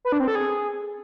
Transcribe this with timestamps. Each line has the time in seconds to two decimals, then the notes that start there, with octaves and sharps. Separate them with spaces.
0.05 B4
0.12 D4
0.20 C4
0.28 A4
0.35 G#4